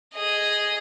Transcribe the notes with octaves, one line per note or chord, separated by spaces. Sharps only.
G#4 D#5